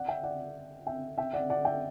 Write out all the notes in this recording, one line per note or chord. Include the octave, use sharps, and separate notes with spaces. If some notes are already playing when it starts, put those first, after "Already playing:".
Already playing: D5 F#5
E5 G5
D5 F#5
E5 G5
E5 G5
D5 F#5
D5 F#5
E5 G5